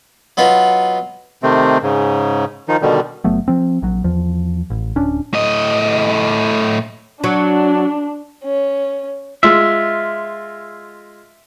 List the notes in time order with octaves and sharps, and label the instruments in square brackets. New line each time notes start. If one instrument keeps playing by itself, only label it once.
[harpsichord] F#3 B3 D#4 F4 F#4 B4
[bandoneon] C3 D#3 A3 C4
G#2 C#3
D#3 F3 D#4
B2 D3 D#3 G3
[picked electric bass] G1 F#3 A3 B3
F3 C4
A#1 F#3
E2 F3
A1
D1 C#4 D4
[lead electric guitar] A2 D#5
[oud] F#3 [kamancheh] D4
[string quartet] C#4
[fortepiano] G#3 F4 [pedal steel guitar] E5